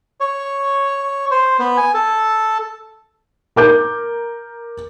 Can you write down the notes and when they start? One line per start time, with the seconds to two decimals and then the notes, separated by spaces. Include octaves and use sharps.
0.20 C#5
1.31 C5
1.59 B3
1.77 G#5
1.94 A4
3.56 A#4 D6 G6